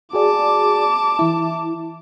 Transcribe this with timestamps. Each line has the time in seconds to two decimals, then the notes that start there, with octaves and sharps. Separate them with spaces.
0.13 F#4 G#4 D5 A5 D6
1.19 E3 E4